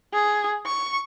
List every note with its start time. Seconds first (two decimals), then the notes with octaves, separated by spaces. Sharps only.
0.13 G#4
0.66 C#6